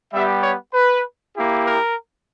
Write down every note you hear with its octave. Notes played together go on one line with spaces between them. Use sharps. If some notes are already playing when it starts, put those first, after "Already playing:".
G3 B3 G4 E5
C#5
B4
A#3 E4 G4
A#4